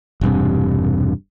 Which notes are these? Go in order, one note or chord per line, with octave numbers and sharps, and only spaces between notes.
E1 G2 C3